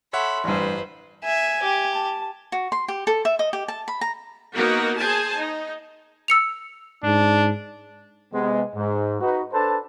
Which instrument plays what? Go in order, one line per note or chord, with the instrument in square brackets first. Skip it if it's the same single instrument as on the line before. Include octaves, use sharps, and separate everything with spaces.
[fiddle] A4 B5 [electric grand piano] C#5 E5 F#5 [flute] C6
[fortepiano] A1 G2 [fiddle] B4 C5
[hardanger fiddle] E5 [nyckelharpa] G#5
[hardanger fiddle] G4
[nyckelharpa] A5
[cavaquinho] F#4
C6
G4
A4
E5
D#5
G4
A5
B5
A#5
[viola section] A#3 B3 D#4 F#4 A#4
G#4 C5 G#5 A5
D#4
[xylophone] E6 C#7 F7
[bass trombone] G#2 [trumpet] D4
[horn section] C3 G#3 B3
G#2
D#4 F#4 B4
D4 A4 B4 C5 A5